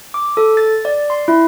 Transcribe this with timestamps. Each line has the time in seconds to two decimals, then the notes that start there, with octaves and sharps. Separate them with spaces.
0.14 D6
0.37 A4
0.57 A6
0.85 D5
1.10 C6
1.28 E4